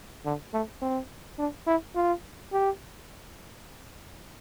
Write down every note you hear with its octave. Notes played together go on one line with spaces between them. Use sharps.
D3
A3
C4
D4
E4
F4
G4